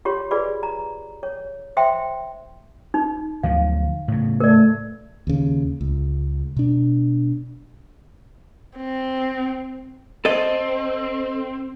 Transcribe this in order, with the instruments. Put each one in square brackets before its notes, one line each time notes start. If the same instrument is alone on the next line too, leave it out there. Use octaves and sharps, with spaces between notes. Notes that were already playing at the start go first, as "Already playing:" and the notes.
[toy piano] F4 G4 C#5 C6
F4 G#4 B4 D5 B5
A#5
C#5
C5 E5 G5 C6
D#4
[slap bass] D2 F3 F#3 [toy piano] F5
[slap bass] A2 C#3
[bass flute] A3 [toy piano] A#4 D5
[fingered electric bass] D#2 C#3
C#2
B2 D4
[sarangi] C4
[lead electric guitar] C4 [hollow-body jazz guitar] A4 D#5